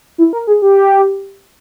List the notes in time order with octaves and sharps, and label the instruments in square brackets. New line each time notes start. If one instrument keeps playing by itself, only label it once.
[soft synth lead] E4
A#4
G#4
G4